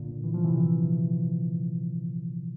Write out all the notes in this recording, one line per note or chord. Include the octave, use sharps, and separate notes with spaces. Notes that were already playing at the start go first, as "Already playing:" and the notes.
Already playing: A#2 D3
E3
F3
C3 E3